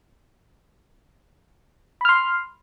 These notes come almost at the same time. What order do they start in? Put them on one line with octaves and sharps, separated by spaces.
B5 F6 C6